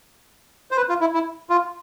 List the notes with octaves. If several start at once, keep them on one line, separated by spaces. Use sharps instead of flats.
C5
B4
F4
E4
E4
F4